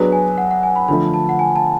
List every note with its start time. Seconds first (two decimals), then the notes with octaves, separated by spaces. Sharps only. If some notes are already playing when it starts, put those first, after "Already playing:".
Already playing: F#3 B3 D4 G#4 B4
0.12 G#5
0.38 F#5
0.51 F#5
0.63 G#5
0.76 B5
0.88 D3 F3 A3 B5
1.14 A5
1.29 F#5
1.39 G#5
1.56 A5